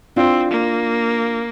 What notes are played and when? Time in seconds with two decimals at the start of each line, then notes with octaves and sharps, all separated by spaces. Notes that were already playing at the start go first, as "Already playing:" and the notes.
0.16 C4 D4 F4
0.51 A#3